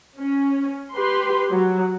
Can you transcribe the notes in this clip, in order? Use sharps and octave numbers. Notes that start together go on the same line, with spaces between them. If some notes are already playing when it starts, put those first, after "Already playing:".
C#4
G4 B4 C6
F#3